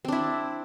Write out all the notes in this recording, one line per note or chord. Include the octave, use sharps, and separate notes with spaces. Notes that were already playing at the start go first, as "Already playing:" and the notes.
C4 D4 E4